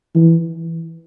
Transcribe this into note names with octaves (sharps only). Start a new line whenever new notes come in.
E3